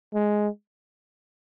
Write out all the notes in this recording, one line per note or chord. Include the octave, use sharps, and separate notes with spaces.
G#3